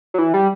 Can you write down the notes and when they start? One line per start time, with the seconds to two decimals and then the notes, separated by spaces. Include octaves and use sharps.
0.14 F#3
0.18 E3
0.34 G3